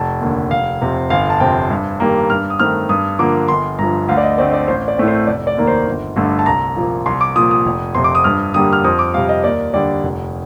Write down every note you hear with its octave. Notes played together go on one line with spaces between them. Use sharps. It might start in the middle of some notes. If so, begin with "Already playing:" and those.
Already playing: F1 A5
D#2 D3
F1 F5
F2 C3
G1 F5
A5
F2 C3 G5
G2
D#3 G3 A#3
G2 F6
D#6
D#3 A3 C4 F6
G2 D#6
D3 F3 A#3 D6
G1 C6
G2 F3 A#5
D2 F5
D5
D#5
D3 A3 C4 D5
D5
A1 C5
D5
A2 A3 C4
C5
F1 D5
D5
D#2 D#3 A#3
C5
G1
G2 D3 A3
A5
C2 A#5
A#2 F3 A#3
C2 C6
D6
A#2 F3 D#6
D#6
F1
F2 C3 F3 C6
D6
D#6
G2 F6
D3 G3 A#3 D#6
F6
F2 D#6
D6
C3 G3 F5
D#5
D#2 D5
D3 G3 D5
F1